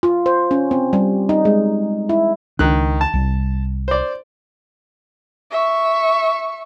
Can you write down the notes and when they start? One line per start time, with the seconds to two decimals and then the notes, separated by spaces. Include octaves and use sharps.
0.03 F4
0.26 C5
0.51 C#4
0.71 C4
0.93 G3
1.29 D#4
1.45 G#3
2.09 E4
2.59 C#2 D#3 D4 F#6
3.01 A5
3.14 C2 G3
3.88 C5 D5
5.51 E5 C#6